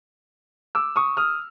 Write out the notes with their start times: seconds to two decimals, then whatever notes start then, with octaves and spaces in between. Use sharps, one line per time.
0.75 D6 E6
0.96 C#6 D#6
1.17 D#6 F6